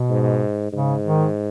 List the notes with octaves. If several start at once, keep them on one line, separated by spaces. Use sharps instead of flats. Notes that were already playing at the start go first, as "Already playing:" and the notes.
Already playing: B2
G#2
G#2 C#3
D#3